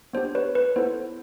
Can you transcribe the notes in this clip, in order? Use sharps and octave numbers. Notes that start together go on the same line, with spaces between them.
B3 D4 G4 C5
B4 C#5
B4
B3 E4 A4 C5